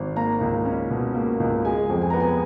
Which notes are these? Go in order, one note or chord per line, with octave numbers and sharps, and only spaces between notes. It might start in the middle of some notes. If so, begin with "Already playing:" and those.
Already playing: G#1
A#3 A#5
C#2
C#4
B2
A#3
C#2
G#3 G#5
F2
G#5
B3 A#5
G#5